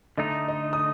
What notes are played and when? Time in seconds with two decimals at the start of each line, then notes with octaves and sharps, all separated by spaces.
0.18 D3 A3 D#4 D#5
0.48 D#5
0.73 D#6